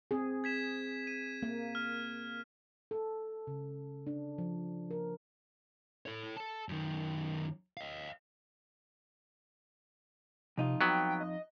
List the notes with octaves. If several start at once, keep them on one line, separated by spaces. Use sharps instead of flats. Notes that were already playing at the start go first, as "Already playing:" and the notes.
C4 G#4
G#6 B6 E7
D#7
A#3
F6
A4
C#3
D4
F3
A#4
A4 C#5
A4 A5
F#2 D#3
D#5 F5
F2 C3 D#4 F4
F#3 B3 G5
D#5